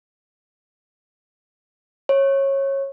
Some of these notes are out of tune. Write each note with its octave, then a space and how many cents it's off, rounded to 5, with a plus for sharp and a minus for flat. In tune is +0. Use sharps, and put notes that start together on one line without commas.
C#5 -20